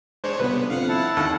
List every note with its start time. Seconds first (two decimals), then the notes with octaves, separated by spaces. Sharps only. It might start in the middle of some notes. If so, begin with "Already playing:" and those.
0.24 G#3 D4 C5 C#5
0.40 G1 C3 B3 B4
0.70 F2 F5 F#5
0.89 E4 A5
1.17 D#2 D3 F#5